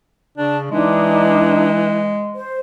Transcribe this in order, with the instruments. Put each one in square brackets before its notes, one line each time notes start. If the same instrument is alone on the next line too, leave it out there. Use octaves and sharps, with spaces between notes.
[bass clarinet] C#3 [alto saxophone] D4 [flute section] A5
[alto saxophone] E3 [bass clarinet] G#3 [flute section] D4 D#4
[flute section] C5